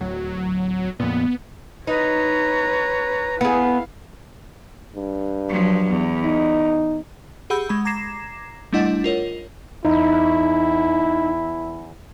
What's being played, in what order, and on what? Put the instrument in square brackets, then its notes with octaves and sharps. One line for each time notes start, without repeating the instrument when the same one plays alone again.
[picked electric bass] D1 [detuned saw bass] F#3
[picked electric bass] F2 A#2 [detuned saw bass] B3
[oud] D#4 [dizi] B4 [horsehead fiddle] C#5 A#5
[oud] B3 G#4 [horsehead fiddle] E4 F5
[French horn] G2
[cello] F3 F#3
E2
[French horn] D#4
[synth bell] G4 G#4 F#5 B5 E6 G6
G#3 B5
A#5 D6 G#6 A#6 C7 E7
G3 A3 D4 E4 D#5 F#5
F4 A#4 C#5
[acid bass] E2 [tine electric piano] D#4 [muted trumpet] E4